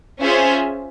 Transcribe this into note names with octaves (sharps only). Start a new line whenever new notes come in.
C#4 F4 G#4 C5 E5